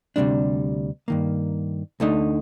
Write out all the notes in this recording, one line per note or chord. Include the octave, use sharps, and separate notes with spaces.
D2 C3 G3 D4
G2 D#3 A#3
D2 D3 A3 D#4